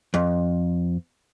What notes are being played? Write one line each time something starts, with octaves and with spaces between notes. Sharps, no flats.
F2